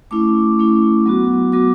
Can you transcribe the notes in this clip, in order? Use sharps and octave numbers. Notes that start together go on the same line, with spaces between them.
A3 C#4 E4 D6
A3 C#4 E4
F#3 B3 F#4
F#3 B3 F#4 D6